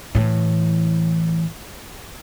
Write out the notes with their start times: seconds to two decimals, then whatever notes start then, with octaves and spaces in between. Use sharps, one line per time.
0.15 A2 E3